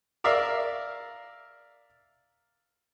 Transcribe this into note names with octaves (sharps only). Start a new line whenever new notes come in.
A#4 D5 E5 F5